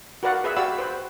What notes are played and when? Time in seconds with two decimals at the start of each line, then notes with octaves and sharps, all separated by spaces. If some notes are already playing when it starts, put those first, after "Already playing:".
0.23 F#4 A#4 B4 D5 F5 F#5
0.44 G#4 B4 E5
0.57 F#4 G4 D5 F5 B5 E6
0.78 B4 C5